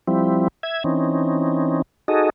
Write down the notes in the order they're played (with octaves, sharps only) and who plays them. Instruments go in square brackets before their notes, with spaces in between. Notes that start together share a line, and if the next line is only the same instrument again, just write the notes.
[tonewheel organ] F3 G3 C4 E4
E5 G#6
E3 C4 C#4 D#4
D#4 F#4 G#4 A4 D#5